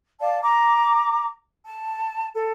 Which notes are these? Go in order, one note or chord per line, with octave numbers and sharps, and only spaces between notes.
D5 F5 A5
A#5 D6
A5
A4